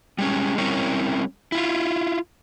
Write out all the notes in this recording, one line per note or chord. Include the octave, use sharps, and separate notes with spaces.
G3 G#3 C#4
G3 C4 C#4 E4 A#4 C#5
E4 F4